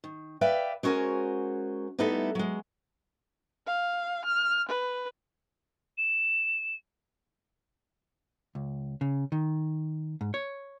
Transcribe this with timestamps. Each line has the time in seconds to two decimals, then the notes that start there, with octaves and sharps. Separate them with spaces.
0.04 D#3
0.41 B4 D5 E5 F5 G5
0.83 G#3 C#4 F#4 A#4 C5 G#5
1.99 G3 A3 B3 D#4 E4 A4
2.35 F#3 G#3
3.67 F5
4.25 F6
4.69 B4
5.98 E7
8.55 C#2
9.01 C#3
9.32 D#3
10.21 G#2
10.34 C#5